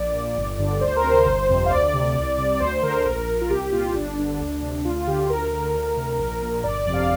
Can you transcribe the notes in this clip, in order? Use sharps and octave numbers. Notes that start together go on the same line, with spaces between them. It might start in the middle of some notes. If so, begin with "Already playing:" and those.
Already playing: A#1 D5
A#2
G1
G2 D3
D2 C5
A#4
C3
C5
G1
F2 C3
F5
D2 D5
C3
C2
C3
D2 C5
D3 A#4
A#1
A#2
F4
C2 G4
A#2 F4
G1 D4
G2 D3
D2
C3
D2 F4
F4
D3 G4
D2 A#4
D3
D2
C3
A#1 A#4
A#2
G1 D5
D5
F2 C3
F5